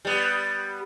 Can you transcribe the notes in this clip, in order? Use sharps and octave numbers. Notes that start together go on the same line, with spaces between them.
G3 B3